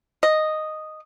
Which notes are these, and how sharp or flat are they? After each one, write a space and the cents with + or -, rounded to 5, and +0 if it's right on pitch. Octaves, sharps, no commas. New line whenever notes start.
D#5 -5